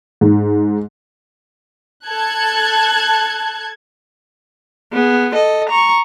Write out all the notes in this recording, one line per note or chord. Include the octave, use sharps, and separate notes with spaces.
G#2
A4 A5 F#6 G#6
B3 G#4
A4 D#5
A#5 C#6